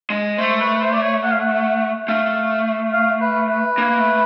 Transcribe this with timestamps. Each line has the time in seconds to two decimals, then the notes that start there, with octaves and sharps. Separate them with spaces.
0.10 G#3
0.38 A3 C5
0.60 B4
0.75 B4
0.81 C5
0.93 D5
1.02 C#5
1.23 F#5
1.31 F5
1.40 F#5
2.08 A3 F5
2.93 F5
3.21 B4
3.49 B4
3.78 A#3
3.98 A3